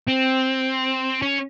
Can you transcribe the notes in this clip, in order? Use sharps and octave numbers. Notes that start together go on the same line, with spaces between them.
C4
C#4